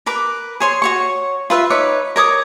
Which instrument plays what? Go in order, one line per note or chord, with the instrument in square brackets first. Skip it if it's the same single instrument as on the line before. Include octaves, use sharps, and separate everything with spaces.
[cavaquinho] A#4 B4 D6
G#4 C#5 C6
F#4 C#5 C#6
F4 B4 E5 F5
D#4 B4 C#5 D6
A#4 C#5 D6 D#6